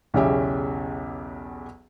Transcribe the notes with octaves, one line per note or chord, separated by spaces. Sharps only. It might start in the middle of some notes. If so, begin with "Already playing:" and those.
B1 E2 C#3 C#4 G4 E5